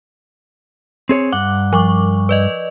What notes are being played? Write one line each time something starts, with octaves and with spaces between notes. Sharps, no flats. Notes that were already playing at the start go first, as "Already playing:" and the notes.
C4 G#4 C#5
G2 F#5 D6
F3 C#6 D6
B4 D5 D#5